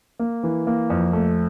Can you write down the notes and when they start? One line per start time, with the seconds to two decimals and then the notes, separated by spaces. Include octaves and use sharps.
0.19 A#3
0.43 E3
0.67 A#3
0.90 F2
1.13 A3